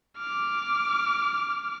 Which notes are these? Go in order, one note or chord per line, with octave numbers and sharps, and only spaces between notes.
D6 F6